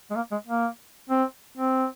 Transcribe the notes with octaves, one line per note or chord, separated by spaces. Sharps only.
G#3
A#3
G#3
A#3
C4
C4